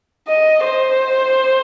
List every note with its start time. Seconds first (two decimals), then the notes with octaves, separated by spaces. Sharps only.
0.28 D#5
0.65 C5